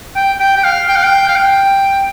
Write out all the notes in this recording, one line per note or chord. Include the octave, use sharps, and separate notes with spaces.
G5
G5
G5
F5
G5
F5
G5
F5
G5